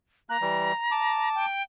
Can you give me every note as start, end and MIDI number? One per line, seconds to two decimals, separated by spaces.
0.29 0.37 58
0.29 1.29 82
0.29 0.37 90
0.41 0.72 52
0.41 0.72 55
0.91 1.46 81
0.91 1.46 86
1.35 1.63 79